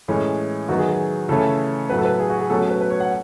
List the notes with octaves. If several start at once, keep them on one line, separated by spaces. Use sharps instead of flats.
A2 E3 G#3 C#4
D#3 F#3 B3 F#4
G#4
G#4
C#3 E3 A3 C#4 A4
A2 F#3 B3 B4
A4
B4
G#4
F#4
G#4
B2 F#3 A3 C#4 A4
B4
B4
C#5
F#5